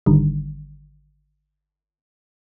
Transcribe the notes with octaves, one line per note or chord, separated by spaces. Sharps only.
G#1 D3 D#3 G3